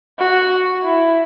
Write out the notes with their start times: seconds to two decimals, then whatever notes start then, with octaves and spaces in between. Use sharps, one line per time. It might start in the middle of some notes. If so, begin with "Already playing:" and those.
0.19 F#4
0.84 E4